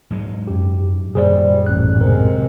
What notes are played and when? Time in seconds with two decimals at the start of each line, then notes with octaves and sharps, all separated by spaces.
0.11 G#2 F#3 G#3
0.48 F#2 G4
1.15 F#2 A#2 D#3 G3 G#4 C5 D5
1.67 A1 F#6
1.99 B1 C3 G#3 A#4 C5